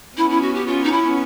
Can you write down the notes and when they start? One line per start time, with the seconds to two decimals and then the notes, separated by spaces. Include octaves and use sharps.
0.17 B3 C#4 E4
0.30 E4
0.41 F#4
0.54 G4
0.67 F4
0.84 D#4
0.92 E4